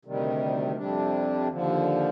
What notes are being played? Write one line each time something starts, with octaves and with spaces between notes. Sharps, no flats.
D2 C3 D#3 G3
F2 C3 G3 D4
D#2 D3 F3